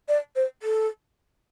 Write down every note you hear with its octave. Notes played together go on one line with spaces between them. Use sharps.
D5
C5
A4